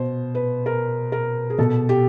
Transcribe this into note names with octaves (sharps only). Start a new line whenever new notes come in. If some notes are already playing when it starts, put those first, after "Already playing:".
Already playing: B2 C5
B4
A#4
A#4
G#4
B2 A4
G4